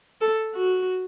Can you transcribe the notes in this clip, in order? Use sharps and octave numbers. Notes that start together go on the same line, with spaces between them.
A4
F#4